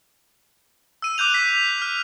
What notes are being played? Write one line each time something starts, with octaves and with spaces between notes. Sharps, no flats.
E6 D#7
D6 F#6 G6 F7
B6
F6